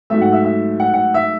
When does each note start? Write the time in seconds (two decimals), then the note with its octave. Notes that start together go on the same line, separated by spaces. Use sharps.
0.10 G#2 F#3 A3 E5
0.21 F#5
0.32 E5
0.44 E5
0.80 F#5
0.94 F#5
1.14 E5